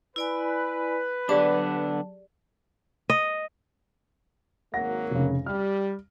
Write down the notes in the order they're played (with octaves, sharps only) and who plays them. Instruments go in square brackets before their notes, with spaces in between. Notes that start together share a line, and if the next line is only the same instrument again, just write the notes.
[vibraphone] E4 D5 G#5 [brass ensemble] B4
[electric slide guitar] D3 B3 D4 [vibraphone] F#3 A5 [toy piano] G4 G#4 D5
[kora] D#5
[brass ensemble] G#1 F#3 A#3 [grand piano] F#5 A#6
[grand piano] F1 C#3
[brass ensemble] G3 [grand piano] F6